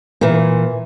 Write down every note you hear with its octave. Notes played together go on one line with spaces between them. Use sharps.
A#2 E3